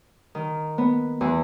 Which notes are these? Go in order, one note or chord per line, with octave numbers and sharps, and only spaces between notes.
D#3
B3
E2